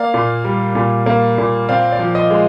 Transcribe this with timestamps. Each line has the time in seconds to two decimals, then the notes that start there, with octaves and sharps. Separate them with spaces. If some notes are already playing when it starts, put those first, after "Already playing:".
Already playing: A#3 D5 F5
0.14 A#2
0.45 G3
0.75 A#2
1.06 A#3
1.38 A#2
1.69 C4 D5 F5
1.92 D5
1.99 F3
2.15 D#5
2.31 G#3